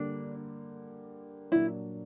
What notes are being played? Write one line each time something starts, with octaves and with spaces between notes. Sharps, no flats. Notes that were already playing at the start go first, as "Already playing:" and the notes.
Already playing: D3 G3 A#3 D4
A#2 F#3 A#3 D4 E4